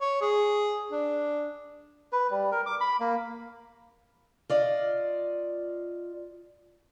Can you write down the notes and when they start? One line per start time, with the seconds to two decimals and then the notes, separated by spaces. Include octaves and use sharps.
0.01 C#5
0.21 G#4
0.92 D4
2.13 B4
2.31 G3
2.52 A#4
2.66 D6
2.81 B5
3.00 A#3
4.50 F4 D5 D#5